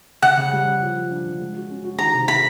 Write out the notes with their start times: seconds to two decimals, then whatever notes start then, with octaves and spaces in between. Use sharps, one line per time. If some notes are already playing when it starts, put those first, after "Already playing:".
0.22 C#3 F#5
0.37 C#3
0.52 G3
0.66 C#3
0.81 F3
0.96 F3
1.11 D4
1.25 C#3
1.40 G#3
1.56 F#4
1.70 C#4
1.84 F#4
1.99 D#3 A#5
2.14 C3
2.28 D#3 B5